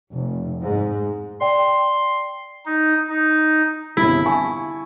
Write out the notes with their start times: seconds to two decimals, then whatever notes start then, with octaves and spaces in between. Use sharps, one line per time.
0.13 F1
0.61 G#2
1.41 D5 G5 C6
2.66 D#4
3.09 D#4
3.97 G1 C2 E4
4.26 G#5 A5 C#6